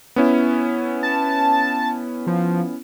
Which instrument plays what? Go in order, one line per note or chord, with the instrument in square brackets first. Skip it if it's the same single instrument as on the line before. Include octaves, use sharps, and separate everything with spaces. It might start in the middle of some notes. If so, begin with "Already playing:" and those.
[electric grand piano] B3 C#4 E4
[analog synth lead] A5
F3